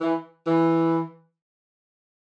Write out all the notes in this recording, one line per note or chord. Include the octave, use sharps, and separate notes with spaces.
E3
E3